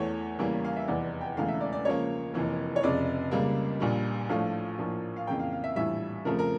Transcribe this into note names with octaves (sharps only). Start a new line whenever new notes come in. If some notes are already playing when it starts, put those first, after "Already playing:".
Already playing: E2 E3 A3 C#5
E2 C#3 E3 G3 A#3
F5
E5
F1 E2 E3 D5
G5
E1 E2 C#3 E3 A3 F5
E5
D5
D5
C#2 C#3 F3 A#3 C#5
F1 F2 E3 A#3
C#5
F1 F2 C#3 D5
C#2 C#3 G3 A#3
A#1 A#2 G3
A#1 A2 F3 A3 F5
A#1 A2 F3 A#3
F5
F2 C#3 E3 A#3 G5
F5
F5
E5
A#1 A2 E3 G3 E5
F2 C#3 F3 A3 A#4
A#4